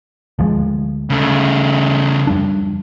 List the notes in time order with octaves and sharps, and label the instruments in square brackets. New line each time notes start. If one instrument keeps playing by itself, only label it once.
[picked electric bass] D2 F3 G#3
[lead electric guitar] C#3 A3
[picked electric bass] F2 G3 D4